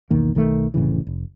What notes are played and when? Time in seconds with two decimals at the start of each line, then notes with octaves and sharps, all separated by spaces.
0.10 B1 E2 D#3 A#3
0.35 B1 D#3 E3 A3
0.74 F1 A2 C#3 E3
1.07 F1